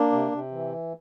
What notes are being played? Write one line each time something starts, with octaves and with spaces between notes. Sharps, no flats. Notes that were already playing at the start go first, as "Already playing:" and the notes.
Already playing: A#3 D4
C3
C3
E3